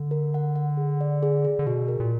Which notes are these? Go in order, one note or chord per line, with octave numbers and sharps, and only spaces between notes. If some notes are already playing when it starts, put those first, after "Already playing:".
Already playing: D3
A#4
F#5
F#5
G#4
D5
G#4
G#4
D3
B2 F#4
A#4
A#2